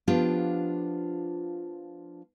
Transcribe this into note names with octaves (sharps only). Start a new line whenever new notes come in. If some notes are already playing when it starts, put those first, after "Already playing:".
F3 B3 D4 F4 G4